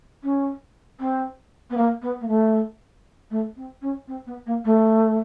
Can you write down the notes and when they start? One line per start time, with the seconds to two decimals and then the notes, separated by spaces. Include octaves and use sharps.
0.23 C#4
1.00 C4
1.70 B3
1.77 A#3
2.02 B3
2.21 A#3
2.28 A3
3.31 A3
3.56 C4
3.82 C#4
4.08 C4
4.26 B3
4.46 A#3
4.65 A3